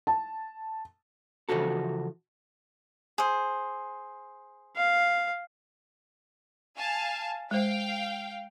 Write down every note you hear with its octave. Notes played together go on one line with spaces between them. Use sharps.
A5
C#3 E3 F3 F#4 A4
G#4 C5
F5
F5 G#5 A5
G#3 C5 F5 G5